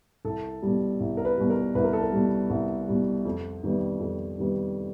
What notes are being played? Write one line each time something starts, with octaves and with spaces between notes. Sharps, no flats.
C2 A4
B2 G3
C2
A#4
B4
B2 G3
A#4
C2 B4
A#4
A4
A#4
B2 G3
C2
B2 G3
F2
C3 D#3 G3 B3
F2
C3 D#3 G3 B3